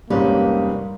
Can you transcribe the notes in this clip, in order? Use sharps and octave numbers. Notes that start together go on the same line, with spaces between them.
F1 G#2 G3 A#3 C#4 D#4 B4